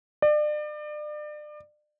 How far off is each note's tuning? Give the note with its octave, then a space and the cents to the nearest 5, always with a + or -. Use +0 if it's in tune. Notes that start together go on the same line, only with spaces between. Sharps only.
D5 +35